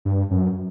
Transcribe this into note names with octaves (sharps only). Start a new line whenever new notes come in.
G2
F#2